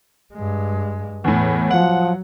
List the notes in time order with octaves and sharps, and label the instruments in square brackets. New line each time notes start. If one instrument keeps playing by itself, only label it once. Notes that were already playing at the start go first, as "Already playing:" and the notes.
[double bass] G2 G#3
[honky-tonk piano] E2 A2 [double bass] E3
[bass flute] F3 [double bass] F#3 [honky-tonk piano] F#5